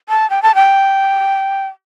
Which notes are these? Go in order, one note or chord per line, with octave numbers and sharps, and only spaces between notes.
A5
G5
A5
G5